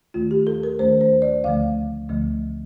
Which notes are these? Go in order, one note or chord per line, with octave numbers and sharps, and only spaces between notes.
D#2 D#3 A3 F4
G4
A4
A#4
D#2 D#3 A3 C5
C5
D5
D2 D3 F3 A3 F5
D2 D3 F3 A3